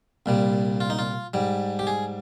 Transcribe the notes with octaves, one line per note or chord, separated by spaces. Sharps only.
C2 A#2 G3
F4
D#4
F4
G#2 G3
G4
G#4